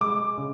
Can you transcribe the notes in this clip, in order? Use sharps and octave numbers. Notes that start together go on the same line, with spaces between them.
G#3 D6
C#3